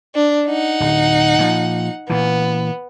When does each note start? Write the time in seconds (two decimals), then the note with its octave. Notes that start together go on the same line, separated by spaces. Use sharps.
0.15 D4
0.47 D#4 F#5
0.80 D1
1.39 A#2 F3
2.10 A#2 E3 B3